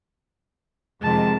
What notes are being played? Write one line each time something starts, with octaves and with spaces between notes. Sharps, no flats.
F2 C3 D#3 G#3 A5